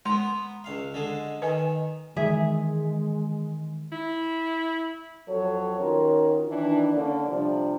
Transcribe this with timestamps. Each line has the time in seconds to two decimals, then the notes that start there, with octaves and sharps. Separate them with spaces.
0.05 G#3 B3 A#5 C6
0.64 C#2 F5
0.94 D3 G#3
1.42 D#3 B4 D#5 G#5
2.16 D#3 E3 G#3 G#4 E5
3.92 E4
5.28 F2 F#3 A4 C#5
5.80 D#3 C#4 F4 F#4 A#4
6.47 D#3 E3 D4
6.92 D3 A#3 C#4 D5
7.26 C3 F3 G3 D4